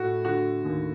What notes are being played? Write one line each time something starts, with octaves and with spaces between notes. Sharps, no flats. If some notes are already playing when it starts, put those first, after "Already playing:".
Already playing: A2 A3 F#4
D3 F#4
D#2